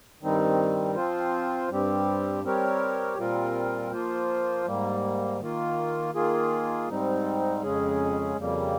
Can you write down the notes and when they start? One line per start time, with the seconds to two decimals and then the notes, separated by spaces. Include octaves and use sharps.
0.21 G2 D#3 G3 C4 D#4
0.95 F3 C4 F4 C5
1.70 G2 G3 C4 G4
2.44 G3 C4 G4 A#4 C#5
3.18 A#2 G3 C4 F4 A#4
3.92 F3 A#3 F4 C5
4.66 G#2 G3 A#3
5.40 D#3 A#3 F4
6.14 D#3 A#3 F4 G#4
6.88 G#2 G3 C4 D#4
7.63 F2 C#3 G#3 C#4 G#4
8.37 F2 C#3 G3 A#3